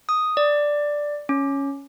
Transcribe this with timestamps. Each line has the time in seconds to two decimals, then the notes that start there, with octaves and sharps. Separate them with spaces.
0.09 D#6
0.37 D5
1.29 C#4